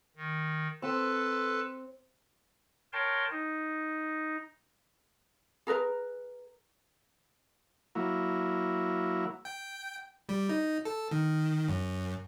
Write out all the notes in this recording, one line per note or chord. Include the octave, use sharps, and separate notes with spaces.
D#3
C4 A4 B4 A5
A#4 C#5 G5 A5 C6
D#4
G#4 A#4 B4 A#5
F#3 A#3 E4
G5
G3
D#4
A4
D#3
F#2